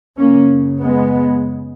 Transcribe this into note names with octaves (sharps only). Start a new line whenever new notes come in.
F#2 C#3 A#3 C#4
G#3 B3